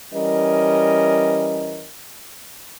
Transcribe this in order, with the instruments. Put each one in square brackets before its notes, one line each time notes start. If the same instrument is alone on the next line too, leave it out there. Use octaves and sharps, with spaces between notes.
[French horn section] E3 G3 C#4 A#4 D#5